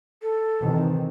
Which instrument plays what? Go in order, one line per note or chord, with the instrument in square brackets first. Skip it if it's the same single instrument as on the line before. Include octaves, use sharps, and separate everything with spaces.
[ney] A4
[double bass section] C3 D#3 E3